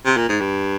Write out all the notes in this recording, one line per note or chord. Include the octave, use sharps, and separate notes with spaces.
C3
A#2
G#2
G2